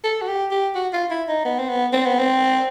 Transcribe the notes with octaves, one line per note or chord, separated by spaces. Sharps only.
A4
F#4
G4
G4
F#4
F4
E4
D#4
B3
C4
B3
C4
B3
C4